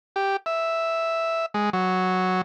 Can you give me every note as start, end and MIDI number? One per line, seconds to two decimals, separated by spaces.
0.16 0.37 67
0.46 1.46 76
1.54 1.70 56
1.73 2.41 54